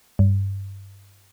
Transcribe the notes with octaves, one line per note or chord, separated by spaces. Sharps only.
G2